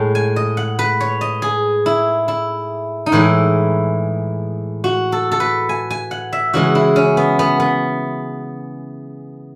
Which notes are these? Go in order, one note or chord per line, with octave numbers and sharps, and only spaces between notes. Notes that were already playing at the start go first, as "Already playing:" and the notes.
Already playing: A2 G#3
G#5
D#5
F#5
B4
C#5
D#5
G#4
E4
E4
D#4
A2 E3 G#3 E4
F#4
A4
A4
B4
G#5
G#5
F#5
E5
C#3 E3 G#3 F#4
E4
C#4
B3
B3
B3